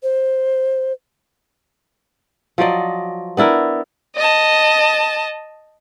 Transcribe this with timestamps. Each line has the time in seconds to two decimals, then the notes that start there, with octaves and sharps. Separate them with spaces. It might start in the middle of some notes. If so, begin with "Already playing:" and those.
0.03 C5
2.58 F3 F#3 D5 D#5
3.37 B3 D4 E4 A#4
4.16 D#5 A5